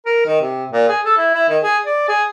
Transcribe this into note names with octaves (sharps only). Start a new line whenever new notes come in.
A#4
D#3
C3
A#2
G#4
A4
E4
E4
D#3
G#4
D5
G#4